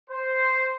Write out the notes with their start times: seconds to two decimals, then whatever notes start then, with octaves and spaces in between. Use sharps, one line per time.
0.10 C5